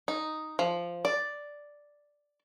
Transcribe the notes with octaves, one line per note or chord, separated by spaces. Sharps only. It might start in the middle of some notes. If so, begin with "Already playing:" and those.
D#4
F3
D5